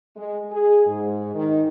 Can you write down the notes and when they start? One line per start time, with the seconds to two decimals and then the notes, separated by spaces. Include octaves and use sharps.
0.16 G#3
0.51 G#4
0.87 G#2
1.35 D#3